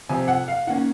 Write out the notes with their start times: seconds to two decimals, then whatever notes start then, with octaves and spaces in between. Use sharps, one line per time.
0.09 C3 F3 C4 G#5
0.28 F#5
0.48 F5
0.67 D#3 A#3 C#4 F#5